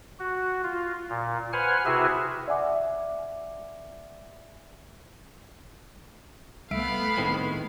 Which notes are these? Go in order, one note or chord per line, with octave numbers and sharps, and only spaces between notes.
F#4
F4
A#2
B4 C5 F#5 G#5 F6
C3 E4 F#4 G#4 B4 E5
D5 E5 F#5 G#5 D6
C2 A3 B3 E5 F5 B5 D7
A2 D#3 G#3 C4